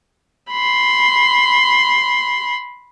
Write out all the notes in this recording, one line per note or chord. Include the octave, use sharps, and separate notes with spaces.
B5 C6